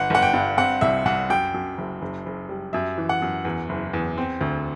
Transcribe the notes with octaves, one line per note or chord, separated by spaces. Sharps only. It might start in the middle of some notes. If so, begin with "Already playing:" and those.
Already playing: G1 F#5
G1 F#5
G5
G2
C4 F#5
C2 E5
C2 F#5
F#2 G5
F#2
F#1
F#1
F#1
G3
F#2 E5
E3
F#5
F#2
E2
F#1
E2
C4
D2